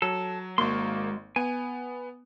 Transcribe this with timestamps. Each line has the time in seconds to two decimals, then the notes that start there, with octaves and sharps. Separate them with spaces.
0.02 F#3 A4
0.58 G#1 G#3 A#3 F#4 C6
1.36 B3 G#5